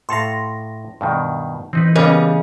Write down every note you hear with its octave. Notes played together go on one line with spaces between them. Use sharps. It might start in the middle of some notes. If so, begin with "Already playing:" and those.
A2 A4 F5 C6 A#6
G2 B2 D#3
E3 C4 D#4 B4
C#3 G3 A#3 B3 A#4 D#5